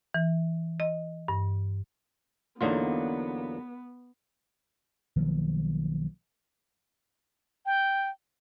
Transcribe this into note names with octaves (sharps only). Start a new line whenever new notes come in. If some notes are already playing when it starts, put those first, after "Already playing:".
E3
D#5
G2
E2 D3 F#3 A#3 B3 D#4 F4
B1 D#3 F3 A#3
G5